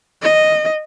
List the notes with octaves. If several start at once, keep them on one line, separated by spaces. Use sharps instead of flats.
D#5